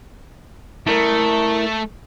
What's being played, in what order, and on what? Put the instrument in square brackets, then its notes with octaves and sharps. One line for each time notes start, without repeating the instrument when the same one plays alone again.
[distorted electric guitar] A3 [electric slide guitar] E4 A#4